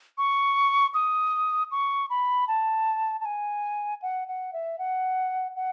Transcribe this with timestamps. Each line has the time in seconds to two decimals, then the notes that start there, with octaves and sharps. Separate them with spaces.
0.18 C#6
0.94 D#6
1.71 C#6
2.10 B5
2.48 A5
3.21 A5
3.25 G#5
4.02 F#5
4.28 F#5
4.53 E5
4.79 F#5
5.56 F#5